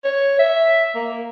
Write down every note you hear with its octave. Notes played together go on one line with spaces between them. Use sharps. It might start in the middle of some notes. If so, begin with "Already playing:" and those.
C#5
E5
A#3